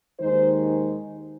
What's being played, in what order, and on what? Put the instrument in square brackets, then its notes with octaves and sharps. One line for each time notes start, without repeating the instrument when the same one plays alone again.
[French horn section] D#2 D#3 G#3 D#4 C5